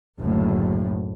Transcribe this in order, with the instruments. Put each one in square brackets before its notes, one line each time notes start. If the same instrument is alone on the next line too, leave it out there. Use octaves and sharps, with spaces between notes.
[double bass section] F#1 D2 A2